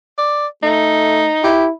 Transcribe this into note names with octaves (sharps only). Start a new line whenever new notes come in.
D5
A3 D#4
E4 G4